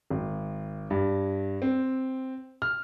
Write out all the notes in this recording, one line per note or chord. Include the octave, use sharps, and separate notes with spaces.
G#1
G2
C4
F6